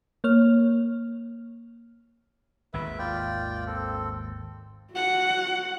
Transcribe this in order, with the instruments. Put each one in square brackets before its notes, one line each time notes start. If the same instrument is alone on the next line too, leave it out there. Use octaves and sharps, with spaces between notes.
[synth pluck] A#3 C#5 F6
[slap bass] G#1 D#2 D#3 [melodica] B4 E5
[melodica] F4 D5 G5
C4 A4
[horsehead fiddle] F#4 F#5